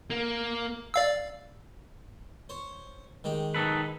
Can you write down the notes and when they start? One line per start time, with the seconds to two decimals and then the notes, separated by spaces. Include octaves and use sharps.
0.10 A#3
0.94 D5 F5 E6
2.49 C5 C#5
3.24 D#3 G#3 G4
3.54 D#4 A4 B4